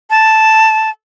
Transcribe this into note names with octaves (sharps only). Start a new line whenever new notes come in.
A5